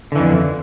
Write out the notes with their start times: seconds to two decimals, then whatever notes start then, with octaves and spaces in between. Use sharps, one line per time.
0.12 D3
0.16 E3
0.19 F2